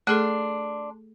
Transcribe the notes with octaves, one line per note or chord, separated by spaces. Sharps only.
A3 D4 G#4 A4 C6